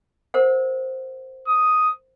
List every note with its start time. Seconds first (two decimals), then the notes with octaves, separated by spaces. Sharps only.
0.34 A#4 C5 F#5
1.48 D#6